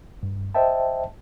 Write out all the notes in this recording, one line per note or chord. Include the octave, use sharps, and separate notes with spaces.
G2
C5 D#5 E5 G5 A5